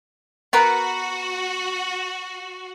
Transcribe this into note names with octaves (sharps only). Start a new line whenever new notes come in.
B3 F#4 A#4 B4